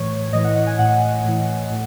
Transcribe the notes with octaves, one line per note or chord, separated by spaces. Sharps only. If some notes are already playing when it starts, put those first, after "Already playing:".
Already playing: A2 E3 C#5
A2 E3 D#5
F#5
F#5
G#5
A2 E3 F#5
A2 E3
A2